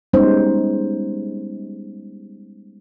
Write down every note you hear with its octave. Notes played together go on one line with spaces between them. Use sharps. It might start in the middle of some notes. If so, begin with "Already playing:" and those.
G3 G#3 B3 C#4 D#4 C5